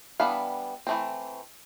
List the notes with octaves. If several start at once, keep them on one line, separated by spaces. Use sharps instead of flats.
E3 G3 B3 D4 F5
E3 A3 C4